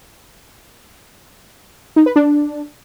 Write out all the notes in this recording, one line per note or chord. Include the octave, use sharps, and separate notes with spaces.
D#4
B4
D4